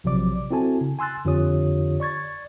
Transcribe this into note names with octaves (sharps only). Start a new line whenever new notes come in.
A#1 C3 F3 F#3 D5 D6
C4 E4 F#4 A4 G#5 A5
C#3
G#5 C6 E6 F#6 A6
F2 D3 F4 G4 C#5 D#6
D5 C#6 G#6 A6